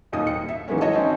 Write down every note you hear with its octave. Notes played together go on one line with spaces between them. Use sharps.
D#1 D#2 D#4 D#6
C#7
E5
D#3 E3 G#3 A#3 B3 C#4
F#4 C#5 D#5 A5 C#6
C4 C#4 D#4